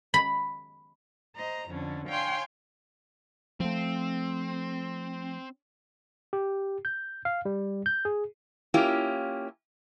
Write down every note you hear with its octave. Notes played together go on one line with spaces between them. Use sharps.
B5
C5 D#5 A#5
F2 D3 C#4
C#5 F5 G5 G#5 C6
F3 A3 C4
G4
G6
F5
G3
G6
G#4
A#3 C#4 E4 F4 G4